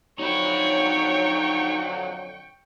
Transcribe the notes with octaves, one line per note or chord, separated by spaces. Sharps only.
F2 D3 F#3 D#4 C#5 G5 B5 C#6